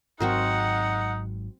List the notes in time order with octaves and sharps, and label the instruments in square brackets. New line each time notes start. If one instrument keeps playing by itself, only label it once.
[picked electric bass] G#1 G#2 F#3 [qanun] C4 F#4 A#4 [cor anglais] D#4 [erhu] F#5